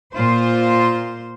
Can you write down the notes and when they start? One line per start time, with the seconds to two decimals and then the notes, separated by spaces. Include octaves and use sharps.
0.16 A#2 F4 C5